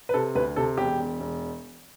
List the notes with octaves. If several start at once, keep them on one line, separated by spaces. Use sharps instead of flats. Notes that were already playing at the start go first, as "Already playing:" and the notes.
B4
C3 A4
D2 B4
C3 A4
E1 G4
E1
E1